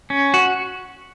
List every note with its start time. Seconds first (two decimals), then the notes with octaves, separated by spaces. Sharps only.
0.10 C#4
0.34 F#4